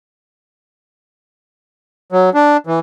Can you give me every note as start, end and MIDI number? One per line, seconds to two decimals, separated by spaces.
2.12 2.30 54
2.34 2.57 62
2.67 2.79 52